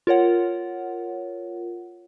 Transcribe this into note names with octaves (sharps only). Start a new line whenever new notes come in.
F4 A#4 C#5 F#5